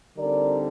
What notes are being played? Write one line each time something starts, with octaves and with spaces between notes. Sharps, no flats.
D3 G3 C4 D#4 A#4 D5